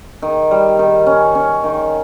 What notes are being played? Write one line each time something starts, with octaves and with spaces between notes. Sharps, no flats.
D#3
G3
D#3
C#4
C#4
D#3